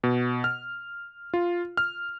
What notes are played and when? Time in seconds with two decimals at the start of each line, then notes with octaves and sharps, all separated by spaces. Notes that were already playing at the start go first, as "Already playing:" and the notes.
0.04 B2
0.44 F6
1.34 F4
1.77 F6